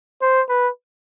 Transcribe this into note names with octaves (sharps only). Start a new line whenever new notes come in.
C5
B4